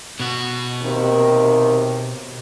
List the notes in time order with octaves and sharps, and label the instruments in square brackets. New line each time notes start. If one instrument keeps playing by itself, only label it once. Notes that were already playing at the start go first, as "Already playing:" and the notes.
[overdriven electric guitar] B2 F#4
[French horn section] D#2 C3 D#3